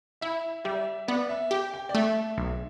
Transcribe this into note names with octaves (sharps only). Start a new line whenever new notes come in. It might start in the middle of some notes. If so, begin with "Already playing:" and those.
E4 E5
G3 E5
B3 D5
E5
G4 G5
G5
D5
A3 E5
B1